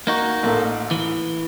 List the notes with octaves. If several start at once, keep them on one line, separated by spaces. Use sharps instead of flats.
A#3 D#4 F#4
A1 A#2 A4
E3